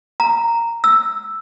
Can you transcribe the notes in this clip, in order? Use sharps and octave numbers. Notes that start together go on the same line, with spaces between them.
A#5
E6